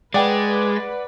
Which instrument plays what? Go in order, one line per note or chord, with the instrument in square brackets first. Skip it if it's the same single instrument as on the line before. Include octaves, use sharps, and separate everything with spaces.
[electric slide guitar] G#3 [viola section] B4 [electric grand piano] D5 F#5 [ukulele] D#5 G5 A#5